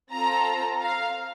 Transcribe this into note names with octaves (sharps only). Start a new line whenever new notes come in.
C4 F4 A4 A#5
F5